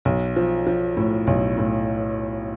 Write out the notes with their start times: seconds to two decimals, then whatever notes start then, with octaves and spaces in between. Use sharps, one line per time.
0.05 B1
0.36 F3
0.67 F3
0.97 A2
1.27 B1
1.58 A2